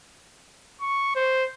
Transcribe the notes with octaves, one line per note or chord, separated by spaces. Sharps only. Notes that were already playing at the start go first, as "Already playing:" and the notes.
C#6
C5